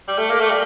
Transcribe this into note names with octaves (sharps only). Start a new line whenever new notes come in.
G3
A3
A#3
A3
G3